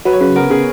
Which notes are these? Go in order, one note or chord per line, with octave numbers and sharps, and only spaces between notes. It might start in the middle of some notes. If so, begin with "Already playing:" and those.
F#3 B4
C#5
C#3 B4
B3 A#4
C#3 G#4